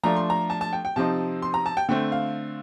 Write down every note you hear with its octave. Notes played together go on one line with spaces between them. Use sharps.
F3 A3 D4 A#5
C6
A#5
A5
A5
G5
G5
C3 F3 C4 D#4 A5
C6
A#5
A5
G5
D3 A3 C4 G5
F5